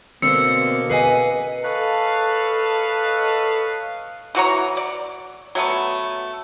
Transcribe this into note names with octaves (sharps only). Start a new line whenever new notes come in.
B2 D3 A#3 C4 C5 E6 C#7
G#4 B4 D#5 G#5 C7
A4 B4 C#5 D#5 F5 A5
E3 F#4 C#5 A#5
D5
F#3 A3 B3